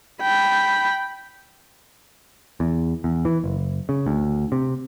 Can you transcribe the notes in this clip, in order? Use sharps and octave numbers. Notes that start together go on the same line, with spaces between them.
G5 B5
E2
E2
E3
F#1
C#3
D2
C3